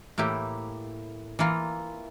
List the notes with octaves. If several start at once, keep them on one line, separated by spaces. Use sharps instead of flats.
A2 E3 A#3 E4 G4
E3 A#3 F4